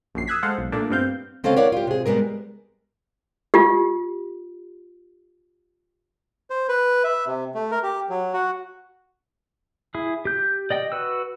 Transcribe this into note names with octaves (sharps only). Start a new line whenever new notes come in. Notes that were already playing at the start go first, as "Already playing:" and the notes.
A#1 F#2 C7
D#6 E6 F#6 G#6 B6
G#3 A4 C5 F5 F#5
B1
A#2 A3 A#3 D4
G2 B3 C4 F5 G6
C#3 C4 C#4 A4 D#5 F5
E4 A#4 C#5 D5 F5 F#5
F4 G4
C3 G#4
G3 G#3 B3 G#4 A#4
F4 G4
C5
B4
E5
C3
A3
A#4
G4
F#3
F#4
E4 G#4
G4 G6
D5 D#5 G5
F#4 B4 E6